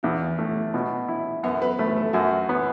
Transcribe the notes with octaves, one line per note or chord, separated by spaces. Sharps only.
E2 E4
A3
B2
E4
F#2 B3
B4
A3 B4
A4
F#2 F#4
B3